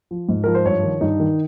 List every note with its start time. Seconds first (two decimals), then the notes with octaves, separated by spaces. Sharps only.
0.11 F3
0.29 G#2
0.44 F3 A#4
0.55 C5
0.65 G2 C#5
0.83 D#3
1.01 G2 D#4
1.20 D#3